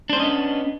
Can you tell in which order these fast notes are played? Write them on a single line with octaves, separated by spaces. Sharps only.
D4 C5 C#4 D#5 B3